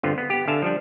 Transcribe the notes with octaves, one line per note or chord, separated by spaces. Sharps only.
G1 D3 B3 C4 F4
B3
B3 G4
D3 E5 F5 G#5 A5
F3 G3 D4